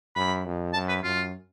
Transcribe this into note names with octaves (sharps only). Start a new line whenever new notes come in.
F#2 B5
F2
F#2 A5
B4
F#2 F4